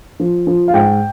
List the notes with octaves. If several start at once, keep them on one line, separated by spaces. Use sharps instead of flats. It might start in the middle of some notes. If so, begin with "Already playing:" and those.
F3
F3
F5
G#2 G5